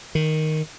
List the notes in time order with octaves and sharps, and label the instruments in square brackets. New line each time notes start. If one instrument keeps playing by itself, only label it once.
[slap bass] D#3